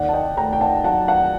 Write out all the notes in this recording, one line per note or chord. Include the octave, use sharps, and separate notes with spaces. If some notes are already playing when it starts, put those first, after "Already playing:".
Already playing: D#2 D5 F#5
A5
D#5 G5
A3 G5 A#5
G5
F#5 A5
F#3 F#5 A5
F#5 A5